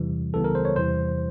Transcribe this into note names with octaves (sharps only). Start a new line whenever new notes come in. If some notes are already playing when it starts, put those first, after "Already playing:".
Already playing: E2 C3 E3 G3
C#2 C#3 E3 G3 B3 A4
A#4
C5
C#5
E2 C3 E3 G3 C5